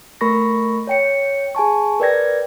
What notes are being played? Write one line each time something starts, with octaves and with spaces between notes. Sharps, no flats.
A3 A#4 B5 C#6 A#6
C#5 G5 C#7
G#4 G#5 A5 C#6
A#4 B4 D5 G5 G#6 A#6